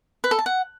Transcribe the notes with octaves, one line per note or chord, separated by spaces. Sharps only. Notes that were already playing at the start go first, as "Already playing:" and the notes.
B4
A4
A5
F#5